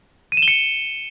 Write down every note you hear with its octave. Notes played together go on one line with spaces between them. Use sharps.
D#7
E7
G7
C#7